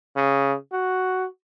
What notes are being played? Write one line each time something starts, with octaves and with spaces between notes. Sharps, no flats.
C#3
F#4